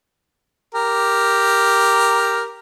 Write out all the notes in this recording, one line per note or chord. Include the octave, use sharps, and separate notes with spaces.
G4 A#4